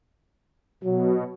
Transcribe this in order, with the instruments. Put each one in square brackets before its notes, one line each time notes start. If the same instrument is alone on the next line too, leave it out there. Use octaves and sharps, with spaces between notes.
[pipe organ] B2 [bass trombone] F#3